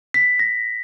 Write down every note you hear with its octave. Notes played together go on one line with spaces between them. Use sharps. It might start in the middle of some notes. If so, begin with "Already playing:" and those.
B6
A#6